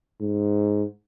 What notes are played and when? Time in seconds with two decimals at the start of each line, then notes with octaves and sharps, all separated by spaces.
0.21 G#2